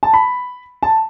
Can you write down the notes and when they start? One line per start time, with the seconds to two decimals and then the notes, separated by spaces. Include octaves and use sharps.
0.03 A5
0.14 B5
0.83 A5